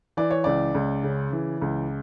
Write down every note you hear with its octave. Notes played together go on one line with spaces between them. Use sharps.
E3 D5
C#5
C#2 D5
C#2
C#3
E3
C#2